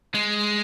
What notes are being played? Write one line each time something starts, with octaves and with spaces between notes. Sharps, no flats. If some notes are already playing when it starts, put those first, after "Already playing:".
G#3